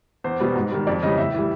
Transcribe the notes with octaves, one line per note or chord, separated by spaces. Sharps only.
E2 C5
B2 G3
G#2
D#3 G3
F2 D5
C#3 E3 G3 D#5
A2 E5
E3 G3